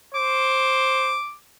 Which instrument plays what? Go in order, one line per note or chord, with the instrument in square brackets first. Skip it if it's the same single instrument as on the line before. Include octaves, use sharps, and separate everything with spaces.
[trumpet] C5 [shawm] D6